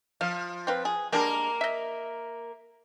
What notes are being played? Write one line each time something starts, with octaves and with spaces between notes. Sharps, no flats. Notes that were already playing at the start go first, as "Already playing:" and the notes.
F3 F5
C4 F4 B4
G#4
G3 G#3 A#3 D4 A#4
D#5 E5